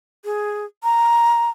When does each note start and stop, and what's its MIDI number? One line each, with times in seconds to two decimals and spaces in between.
0.25 0.65 68
0.84 1.50 82